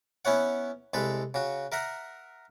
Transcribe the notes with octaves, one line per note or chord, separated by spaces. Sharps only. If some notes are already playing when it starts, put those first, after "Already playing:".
B3 C#4 E4 C#5 F#5
C2 G#3 A4 B4
C#3 F#4
A#4 E5 F#5 A#5